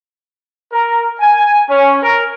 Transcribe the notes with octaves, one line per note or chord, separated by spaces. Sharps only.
A#4
G#5
C#4
A#4